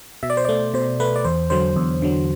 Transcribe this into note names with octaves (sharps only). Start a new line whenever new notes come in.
B2 E5
D5
C5
A3 D5
B2 C5
A3 B4
D5
E2 C5
D3 F#3 C5
E2
D3 F#3